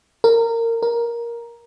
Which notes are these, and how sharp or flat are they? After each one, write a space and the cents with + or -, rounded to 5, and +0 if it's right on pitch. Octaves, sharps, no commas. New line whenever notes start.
A#4 -20
A#4 +10